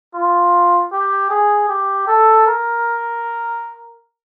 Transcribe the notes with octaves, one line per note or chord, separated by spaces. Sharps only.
F4
G4
G#4
G4
A4
A#4